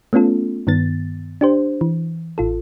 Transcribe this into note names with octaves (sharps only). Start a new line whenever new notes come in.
A3 B3 C#4 F4 A4
G2 D#3 B3 A6
D4 G4 C5
E3
A1 F4 A4